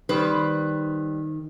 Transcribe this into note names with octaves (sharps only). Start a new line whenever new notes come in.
D#3 G3 B4 C5